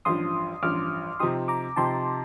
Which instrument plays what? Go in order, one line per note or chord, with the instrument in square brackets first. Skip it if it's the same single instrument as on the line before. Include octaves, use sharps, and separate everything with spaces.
[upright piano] A1 G2 F3 [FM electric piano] C6 D#6
[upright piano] A1 G2 F3 [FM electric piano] D6 F6
[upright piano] C3 F3 C4 D#4 G4 [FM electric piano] C6 D#6
[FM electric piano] A#5 D6
[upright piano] C3 F3 C4 D#4 G4 [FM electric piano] A5 C6